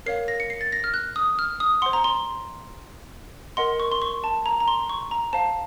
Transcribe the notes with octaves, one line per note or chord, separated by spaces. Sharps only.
A#4 C#5 F5 C7
A#6
C#7
C7
A6
A#6
F6
F#6
D#6
F6
D#6
C5 F#5 C6
A#5
C6
A#4 D#5 F#5 C6
C#6
C6
C#6
A5
A#5
A#5
C6
C#6
A#5
C5 F5 A5